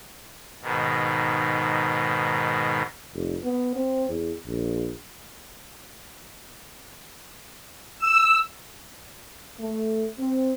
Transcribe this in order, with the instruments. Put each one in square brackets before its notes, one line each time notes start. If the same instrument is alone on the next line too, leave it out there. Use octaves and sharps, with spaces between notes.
[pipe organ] G#2 B2 D#3
[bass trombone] F1
B3
C4
E2
A#1
[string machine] E6
[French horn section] A3
C4